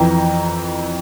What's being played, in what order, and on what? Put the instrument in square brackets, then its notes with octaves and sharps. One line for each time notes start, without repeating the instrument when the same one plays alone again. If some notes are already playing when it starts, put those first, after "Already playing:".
Already playing: [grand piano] F2 E3 G5 A#5